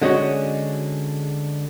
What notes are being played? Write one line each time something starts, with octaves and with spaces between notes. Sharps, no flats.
D3 G#3 C#4 F#4